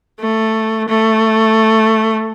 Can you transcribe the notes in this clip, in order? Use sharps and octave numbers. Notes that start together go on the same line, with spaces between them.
A3
A3